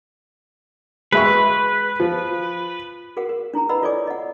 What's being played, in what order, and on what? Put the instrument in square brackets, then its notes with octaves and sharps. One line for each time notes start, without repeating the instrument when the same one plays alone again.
[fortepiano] G#3 E5 C#6 [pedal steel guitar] B4
[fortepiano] F3
[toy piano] F#4 G#4 A#4 F#5
A#4
D4 E4 G#4 A#5
E4 B4 D#5 F#5 B5 E6
F4 A4 C#5 D5 G#5 D6
D#5 F#5